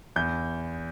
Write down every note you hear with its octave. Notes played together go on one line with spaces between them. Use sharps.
E2 G6